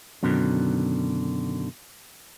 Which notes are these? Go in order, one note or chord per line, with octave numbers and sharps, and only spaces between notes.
F#2 B2 D3 D#3